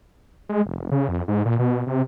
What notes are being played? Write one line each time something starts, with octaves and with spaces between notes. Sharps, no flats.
G#3
F1
C#3
F2
G#2
A#2
B2
C3